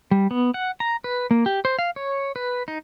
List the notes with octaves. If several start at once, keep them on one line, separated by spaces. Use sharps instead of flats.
G3
B3
F#5
A#5
B4
A#3
G4
C5
F5
C#5
B4
D#4